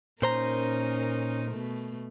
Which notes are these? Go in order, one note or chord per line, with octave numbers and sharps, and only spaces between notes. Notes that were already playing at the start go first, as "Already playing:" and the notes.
A#2 C#4 D#4 A#4 C5 A#5
B2 A3